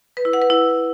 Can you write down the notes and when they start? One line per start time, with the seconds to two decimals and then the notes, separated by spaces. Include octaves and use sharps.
0.17 B4
0.25 E4
0.33 F#5
0.42 B4
0.50 E4